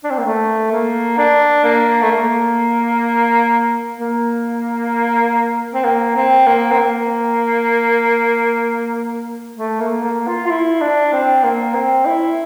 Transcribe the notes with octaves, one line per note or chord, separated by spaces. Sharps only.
D4
C4
A#3
A3
A#3
D4
A#3
A3
A#3
A#3
C4
A#3
C4
A#3
C4
A#3
A3
A#3
A#3
F4
F4
E4
D4
C4
A#3
C4
E4